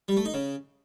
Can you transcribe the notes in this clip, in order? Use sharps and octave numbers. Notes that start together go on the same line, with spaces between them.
G3
A3
D#4
C#3